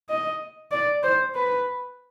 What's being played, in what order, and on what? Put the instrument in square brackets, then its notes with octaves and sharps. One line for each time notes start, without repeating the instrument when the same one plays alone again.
[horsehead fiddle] D#5
D5
C5
B4